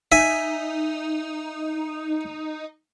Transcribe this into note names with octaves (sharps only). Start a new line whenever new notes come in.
D#4 E5 G#5